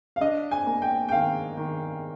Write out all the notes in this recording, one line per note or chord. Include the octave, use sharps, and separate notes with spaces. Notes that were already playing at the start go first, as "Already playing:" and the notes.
F5
D4 D#5
G#5
A#3
G5
G5
D#3 F5
D#3